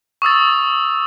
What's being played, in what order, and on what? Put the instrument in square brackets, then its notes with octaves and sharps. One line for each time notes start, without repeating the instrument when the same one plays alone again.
[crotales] C#6 D#6 E6 A6